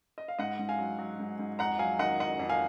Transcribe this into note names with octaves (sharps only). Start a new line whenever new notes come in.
D#5
F5
G#2 D#5 F#5
G#2
F5 G#5
F#3
F#3
G#2
G#2
F2 F#5 A#5
F#3 F5 G#5
D#3 D#5 F#5
F2 D#5 F#5
F2
F5 G#5